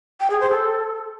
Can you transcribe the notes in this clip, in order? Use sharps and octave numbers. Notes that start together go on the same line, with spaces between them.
G5
G#4
C5
A4